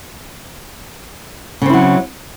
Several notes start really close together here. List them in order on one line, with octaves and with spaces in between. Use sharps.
C#3 C4 E4 F#3